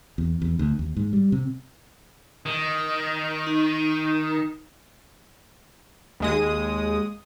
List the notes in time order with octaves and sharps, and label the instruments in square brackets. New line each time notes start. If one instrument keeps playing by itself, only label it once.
[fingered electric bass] E2
E2
D2
D#2
G#2
G3
C3
[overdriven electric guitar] D#3
[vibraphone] D#4
[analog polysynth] D#2 G#3 D#6